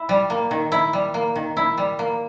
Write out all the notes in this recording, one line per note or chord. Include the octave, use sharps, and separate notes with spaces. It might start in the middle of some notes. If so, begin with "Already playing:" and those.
Already playing: E4
G3
A#3
D#3
E4
G3
A#3
D#3
E4
G3
A#3